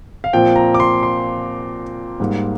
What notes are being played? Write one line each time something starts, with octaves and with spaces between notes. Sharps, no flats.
F5
A#2 F3 C4 G5
A#5
D6
C6
C6
G#2 G3 A#3